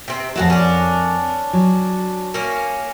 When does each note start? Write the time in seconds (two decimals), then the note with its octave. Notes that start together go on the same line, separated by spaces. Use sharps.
0.08 C3 C4
0.36 F2 C#3 F#4 A#4 E5 A5
0.50 C#4 D4
1.53 F#3
2.34 A#3 C#4